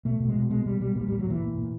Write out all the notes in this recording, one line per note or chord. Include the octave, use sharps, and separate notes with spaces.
B2 A3
B2
G#3
B2
B2 G#3
B2 G3
B2 G3
A#2 G3
A#2 G3
F#3
A#2 E3
A#2
A#2